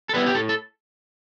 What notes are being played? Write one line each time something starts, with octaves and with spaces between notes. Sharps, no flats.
A4
G3 B3 E4 B4
G4
A2 A4
A4